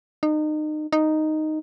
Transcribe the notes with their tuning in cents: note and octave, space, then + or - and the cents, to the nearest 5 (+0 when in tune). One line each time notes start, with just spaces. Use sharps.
D#4 -30
D#4 -5